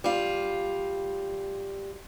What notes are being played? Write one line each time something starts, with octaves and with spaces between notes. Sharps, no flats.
G3 F4